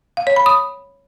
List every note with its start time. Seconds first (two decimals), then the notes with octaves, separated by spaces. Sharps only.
0.17 F5
0.27 C#5
0.36 B5
0.46 D#6